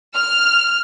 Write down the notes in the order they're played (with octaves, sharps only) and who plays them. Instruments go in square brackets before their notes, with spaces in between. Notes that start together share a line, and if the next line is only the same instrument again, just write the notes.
[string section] F6